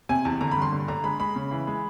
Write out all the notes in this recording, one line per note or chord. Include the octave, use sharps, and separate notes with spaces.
C3 G#5
E2 A5
D3 A#5
B5
G2
C6
D3
D3 A#5
G#3 B5
G#3 B5
C#3
E3
G#3